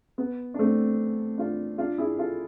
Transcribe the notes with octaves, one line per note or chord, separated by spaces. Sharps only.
B3
D4
A3 C4
D4 F4
D4 F4
E4 G#4
F4 A4